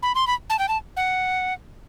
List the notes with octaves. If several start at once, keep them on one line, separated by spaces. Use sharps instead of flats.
B5
C6
B5
A5
G5
A5
F#5